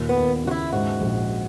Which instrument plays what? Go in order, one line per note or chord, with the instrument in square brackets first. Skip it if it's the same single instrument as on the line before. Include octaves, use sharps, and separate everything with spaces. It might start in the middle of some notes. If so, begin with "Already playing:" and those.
Already playing: [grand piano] D#2 A#2
[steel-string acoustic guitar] B3
[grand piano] D#2
[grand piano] C#3 [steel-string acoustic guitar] F#4
[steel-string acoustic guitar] E4
[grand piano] G#2 [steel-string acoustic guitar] F#4
[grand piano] A#1